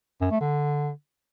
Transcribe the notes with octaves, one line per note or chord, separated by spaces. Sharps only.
F#2
A3
D3